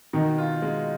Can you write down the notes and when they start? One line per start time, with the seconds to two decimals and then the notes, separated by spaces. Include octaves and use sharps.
0.13 B2 D#3
0.38 F4
0.62 G#3